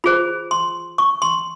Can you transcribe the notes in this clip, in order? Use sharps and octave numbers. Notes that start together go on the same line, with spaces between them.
F4 G#4 C5 B5
C6
C#6
C6